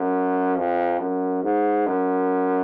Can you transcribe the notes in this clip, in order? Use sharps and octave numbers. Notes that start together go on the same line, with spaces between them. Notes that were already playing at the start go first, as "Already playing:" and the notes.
Already playing: F#2
F2
F#2
G#2
F#2